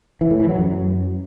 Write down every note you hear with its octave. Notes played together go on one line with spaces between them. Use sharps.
E3
A2
E3
F#3
F#2